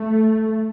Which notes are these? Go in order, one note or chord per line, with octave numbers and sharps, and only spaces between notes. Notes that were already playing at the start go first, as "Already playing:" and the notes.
Already playing: A3